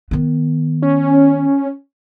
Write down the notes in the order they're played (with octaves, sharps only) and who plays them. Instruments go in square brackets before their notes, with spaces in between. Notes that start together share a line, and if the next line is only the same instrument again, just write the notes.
[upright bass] D#3 B3
[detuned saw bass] C#4